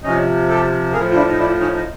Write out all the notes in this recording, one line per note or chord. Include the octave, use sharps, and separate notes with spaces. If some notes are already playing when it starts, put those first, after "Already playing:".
C3 F3 C#4 D#4
G4 A4
A2 F3 G#4 A#4
F4
D4 E4
D#4
D4 E4
C#4 D#4
D#4